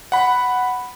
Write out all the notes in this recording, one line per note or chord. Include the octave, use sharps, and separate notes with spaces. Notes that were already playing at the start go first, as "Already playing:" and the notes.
F#5 B5